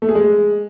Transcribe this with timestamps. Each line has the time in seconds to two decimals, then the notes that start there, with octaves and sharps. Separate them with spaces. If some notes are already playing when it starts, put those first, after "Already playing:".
0.02 A3
0.09 G#4
0.15 G#3